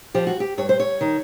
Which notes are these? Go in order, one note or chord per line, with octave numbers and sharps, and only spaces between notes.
F3 G4
F#4
G4
G2 C#5
C5
C#5
D#3